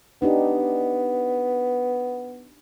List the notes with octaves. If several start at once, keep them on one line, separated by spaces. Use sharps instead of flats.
B3 D4 D#4 G4